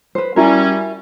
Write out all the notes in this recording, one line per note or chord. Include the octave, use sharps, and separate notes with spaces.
B4 C5
G3 C#4 E4 F#4 A#4